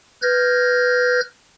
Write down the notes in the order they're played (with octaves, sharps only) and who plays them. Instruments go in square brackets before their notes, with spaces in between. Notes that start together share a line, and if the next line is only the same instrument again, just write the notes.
[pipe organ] B4 F6 G6 G#6 A#6